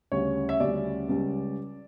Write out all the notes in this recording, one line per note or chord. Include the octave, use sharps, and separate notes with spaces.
D2 C#3 G3 C#4 C#5
E5
D2 C#3 G3 C#4 D5
C#2 C#3 G3 C#4